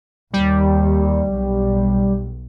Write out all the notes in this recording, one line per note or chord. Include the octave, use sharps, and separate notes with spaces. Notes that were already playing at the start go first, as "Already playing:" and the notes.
D#2 G3
B1